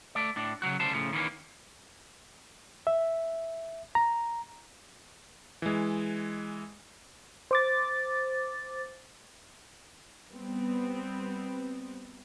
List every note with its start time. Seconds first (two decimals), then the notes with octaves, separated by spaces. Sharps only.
0.15 A3 D5
0.36 A2 D4
0.62 C#3 E3 F#3 F#4
0.80 D2 C#3 G3 C5 A5
0.94 A2 C#3 F3
1.13 D#3 E3 A#3 C#4
2.87 E5
3.95 A#5
5.62 E3 G#3
7.51 C5 D6 A6
10.30 G3 B3 C4